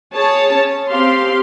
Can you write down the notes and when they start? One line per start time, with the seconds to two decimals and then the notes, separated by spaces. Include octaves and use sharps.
0.15 G#4 C#5 A5
0.55 C#4
0.89 C4 G4 F5 C6